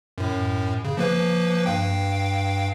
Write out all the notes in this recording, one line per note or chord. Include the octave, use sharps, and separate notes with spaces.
F#2 A2
C#3
F3 A#3 B4
G2 F5 G5